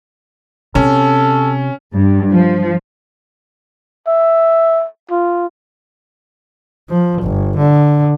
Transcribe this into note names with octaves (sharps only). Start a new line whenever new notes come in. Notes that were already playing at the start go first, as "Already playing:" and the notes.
C3 C#4 A4
G2
F3
E5
F4
F3
G1
D3